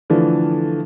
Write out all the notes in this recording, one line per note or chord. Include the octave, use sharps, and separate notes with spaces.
D3 E3 F3 A3 D4